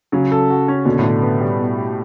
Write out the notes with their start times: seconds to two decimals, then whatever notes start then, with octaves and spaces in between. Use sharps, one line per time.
0.12 C#3 F#3
0.32 A4
0.50 F#4
0.68 C#4
0.85 B2 D3
0.99 A2
1.04 D3
1.22 B3
1.41 G3
1.59 B2
1.78 G4